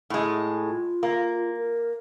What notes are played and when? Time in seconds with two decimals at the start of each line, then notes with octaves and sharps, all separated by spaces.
0.10 A2 G#3
0.65 F4
1.03 A#3
1.57 A#4